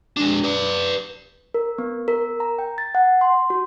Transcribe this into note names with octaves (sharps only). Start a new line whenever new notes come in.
G#3 D4
B4 D5
A#4
B3
A#4
A#5
G5
A6
F#5
C6
F#4